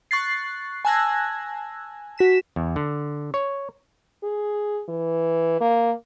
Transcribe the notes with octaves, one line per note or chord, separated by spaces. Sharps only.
C#6 F#6 A6 C7
G#5 A5 E6 F#6 G#6 A#6
F#4 B6 E7
E2
D3
C#5
G#4
E3
A#3